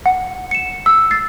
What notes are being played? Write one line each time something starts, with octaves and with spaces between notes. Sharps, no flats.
F#5
C#7 E7
E6
A6 C7